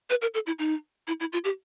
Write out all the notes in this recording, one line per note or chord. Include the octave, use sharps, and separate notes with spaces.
B4
A#4
A4
E4
D#4
E4
E4
F4
G4